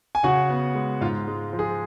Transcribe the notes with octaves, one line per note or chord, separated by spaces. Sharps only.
G#5
C#3 F#4 F#5
B3
G#3
G#2 F4 F5
G#3
F3
G#4